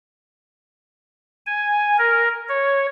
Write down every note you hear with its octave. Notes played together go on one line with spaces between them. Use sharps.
G#5
A#4
C#5